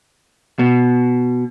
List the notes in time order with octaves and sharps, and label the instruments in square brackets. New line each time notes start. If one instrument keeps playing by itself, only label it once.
[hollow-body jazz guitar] B2